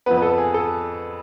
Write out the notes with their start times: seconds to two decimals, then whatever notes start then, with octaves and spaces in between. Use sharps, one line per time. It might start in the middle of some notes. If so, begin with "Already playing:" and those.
0.06 F2 F3 B3 B4
0.17 B4
0.22 A4
0.38 G#4
0.54 A4